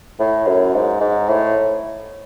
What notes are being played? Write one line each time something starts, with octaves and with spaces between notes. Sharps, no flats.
A2
F#2
G#2
G#2
A2